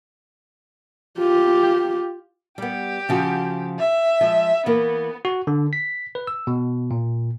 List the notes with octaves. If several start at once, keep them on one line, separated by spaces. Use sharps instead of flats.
F4 G4
G3 B3 G4
C#3 F3 F#4
E5
F3 G#3
E3 A#3 B3
F#4
D3
B6
B4
E6
B2
A#2